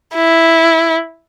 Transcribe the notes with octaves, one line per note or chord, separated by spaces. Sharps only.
E4